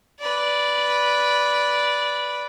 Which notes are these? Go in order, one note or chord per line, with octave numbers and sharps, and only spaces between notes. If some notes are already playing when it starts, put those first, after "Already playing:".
B4 D5